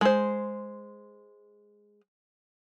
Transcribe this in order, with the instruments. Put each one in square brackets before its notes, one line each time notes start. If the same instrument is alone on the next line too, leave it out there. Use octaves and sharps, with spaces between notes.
[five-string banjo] G#3 C5